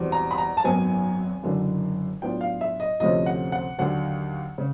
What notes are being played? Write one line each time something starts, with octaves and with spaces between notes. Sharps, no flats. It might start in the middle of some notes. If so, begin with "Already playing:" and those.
Already playing: E2 B2 G3 C4
A#5
B5
A#5
A5
G#1 F#2 D#3 F#3 B3 G#5
F#1 F#2 D3 F#3
A2 F#3 B3 D4 F4 G5
F5
E5
D#5
D2 C3 F3 A3 C#4 D#5
F#5
F#5
D#2 D3 F#3 F#5
C#3